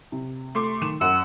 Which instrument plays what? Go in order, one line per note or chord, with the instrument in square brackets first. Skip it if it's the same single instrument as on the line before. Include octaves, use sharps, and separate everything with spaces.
[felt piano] C3
[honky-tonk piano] A3 C6 D6
[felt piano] D#3 E7
[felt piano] F#2 [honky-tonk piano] F#5 [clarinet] E6